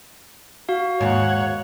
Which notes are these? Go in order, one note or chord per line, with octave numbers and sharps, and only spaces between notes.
F#4 F5
D#2 G#2 C#5 F#5